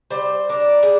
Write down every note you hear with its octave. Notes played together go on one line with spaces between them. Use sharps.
G3 C5
D4 A#4
G#4